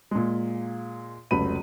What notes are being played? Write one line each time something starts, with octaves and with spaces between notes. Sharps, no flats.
A#2 G#3
F1 C#2 F#3 B3 B5 D#7